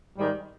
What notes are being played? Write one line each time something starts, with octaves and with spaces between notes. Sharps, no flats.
G#2 D#3 G3